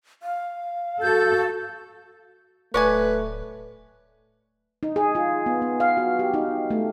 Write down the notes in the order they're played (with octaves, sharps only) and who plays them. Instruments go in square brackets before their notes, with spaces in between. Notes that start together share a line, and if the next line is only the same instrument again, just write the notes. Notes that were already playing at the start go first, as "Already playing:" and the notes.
[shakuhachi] F5
[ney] F#4 [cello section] A4 [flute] G6
[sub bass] D1 [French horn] A3 [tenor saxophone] B4 [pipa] C#5 D5 G#5
[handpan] D#4
G#4
F4
B3
B3
F5
F#4
G4
D#4
A3